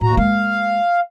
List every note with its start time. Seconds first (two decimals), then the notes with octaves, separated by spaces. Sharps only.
0.01 D#2 A2 F#4 A#5
0.17 G#3 A#3 F5